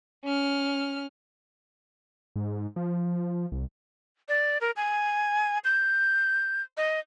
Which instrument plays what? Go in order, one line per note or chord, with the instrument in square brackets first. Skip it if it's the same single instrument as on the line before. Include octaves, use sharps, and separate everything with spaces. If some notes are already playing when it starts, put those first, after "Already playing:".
[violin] C#4 F6
[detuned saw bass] G#2
F3
C2
[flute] D5
A#4
G#5
G6
D#5